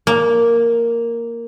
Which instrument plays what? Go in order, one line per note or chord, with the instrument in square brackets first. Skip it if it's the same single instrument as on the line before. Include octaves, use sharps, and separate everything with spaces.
[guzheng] A#3